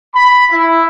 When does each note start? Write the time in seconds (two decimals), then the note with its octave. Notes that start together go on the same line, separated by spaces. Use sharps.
0.13 B5
0.51 E4